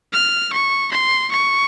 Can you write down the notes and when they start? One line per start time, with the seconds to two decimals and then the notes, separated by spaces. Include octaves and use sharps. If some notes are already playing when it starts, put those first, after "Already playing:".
0.13 F6
0.53 C#6
0.92 C6
1.31 C#6